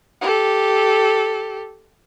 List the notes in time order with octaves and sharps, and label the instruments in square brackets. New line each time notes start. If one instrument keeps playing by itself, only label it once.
[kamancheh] G4 A4